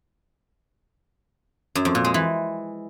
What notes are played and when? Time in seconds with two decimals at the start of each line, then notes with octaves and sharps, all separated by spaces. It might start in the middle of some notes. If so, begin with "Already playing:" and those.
1.75 F#2
1.85 F2
1.95 A#2
2.05 G#3
2.14 E3